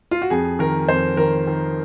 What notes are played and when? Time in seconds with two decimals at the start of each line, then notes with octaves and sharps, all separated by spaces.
0.11 F4
0.22 F#4
0.30 F2 G#4
0.59 D#3 A#4
0.88 F2 C5
1.17 D#3 A#4
1.47 D#3